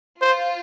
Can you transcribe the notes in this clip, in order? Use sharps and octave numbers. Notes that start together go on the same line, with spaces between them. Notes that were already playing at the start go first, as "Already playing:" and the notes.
F4 C5